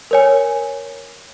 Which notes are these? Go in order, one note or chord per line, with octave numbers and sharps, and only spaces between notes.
A#4 C#5 G#5